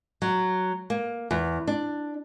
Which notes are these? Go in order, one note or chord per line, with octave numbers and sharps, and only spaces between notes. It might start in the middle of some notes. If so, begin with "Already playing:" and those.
F#3
A#3
E2
D4